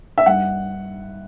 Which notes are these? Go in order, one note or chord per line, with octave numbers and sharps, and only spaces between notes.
E5
G2 F#5